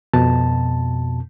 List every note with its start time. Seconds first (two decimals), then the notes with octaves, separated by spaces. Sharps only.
0.13 F2 B2 A5